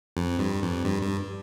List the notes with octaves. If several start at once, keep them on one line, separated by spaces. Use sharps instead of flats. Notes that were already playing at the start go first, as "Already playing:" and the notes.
F2
G2
F2
G2
G2